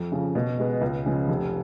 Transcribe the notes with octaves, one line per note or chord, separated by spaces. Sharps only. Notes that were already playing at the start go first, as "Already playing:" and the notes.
Already playing: F2
C#3 F3
B2
G#3 B3
C#2
C#3 F3 G#3
F1